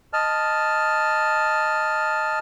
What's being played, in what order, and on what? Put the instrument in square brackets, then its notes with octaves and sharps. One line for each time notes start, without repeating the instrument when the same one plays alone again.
[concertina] D#5 A5 F6